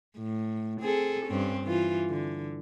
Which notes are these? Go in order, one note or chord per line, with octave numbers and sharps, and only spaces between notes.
A2
C4 G#4 A4
G2 C4 C#4
E3 F4
D3